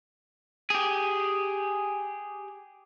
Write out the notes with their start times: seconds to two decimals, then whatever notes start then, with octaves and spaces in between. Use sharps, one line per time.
0.70 G4 G#4